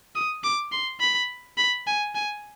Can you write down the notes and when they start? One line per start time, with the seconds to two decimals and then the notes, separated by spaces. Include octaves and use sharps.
0.15 D#6
0.44 D6
0.72 C6
1.00 B5
1.58 B5
1.87 G#5
2.15 G#5